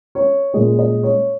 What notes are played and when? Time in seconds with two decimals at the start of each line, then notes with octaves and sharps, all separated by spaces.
0.15 C#5
0.54 A#2 G#3 D#5
0.79 D#5
1.03 C#5